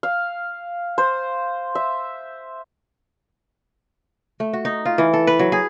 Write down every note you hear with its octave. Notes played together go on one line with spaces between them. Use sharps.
F5
C5
E5
A3
F#4
D#4
F4
E3
A4
B4
F#3
G#4